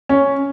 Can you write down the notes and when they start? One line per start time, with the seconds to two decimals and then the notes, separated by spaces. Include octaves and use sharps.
0.09 C#4